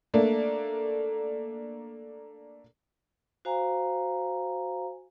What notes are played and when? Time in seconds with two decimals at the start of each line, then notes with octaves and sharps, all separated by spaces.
0.14 A3 A#3 D4
3.45 F#4 C5 F5 G#5 A#5